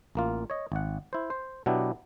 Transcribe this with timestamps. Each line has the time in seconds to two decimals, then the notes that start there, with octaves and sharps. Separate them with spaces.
0.15 A1 A#3 F4
0.50 C#5 D#5
0.72 G#1 F#5
1.13 E4 C5
1.30 C5
1.66 B2 F#3 B3 D4 E4 G4